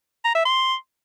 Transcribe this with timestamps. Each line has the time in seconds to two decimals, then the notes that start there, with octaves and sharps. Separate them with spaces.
0.25 A#5
0.35 E5
0.45 C6